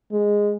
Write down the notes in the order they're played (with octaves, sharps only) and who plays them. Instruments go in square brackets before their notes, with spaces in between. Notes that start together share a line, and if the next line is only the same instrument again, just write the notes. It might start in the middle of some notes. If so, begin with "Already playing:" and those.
[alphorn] G#3